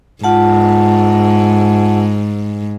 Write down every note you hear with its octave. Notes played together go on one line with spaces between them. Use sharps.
G#2 F4 F#5 A5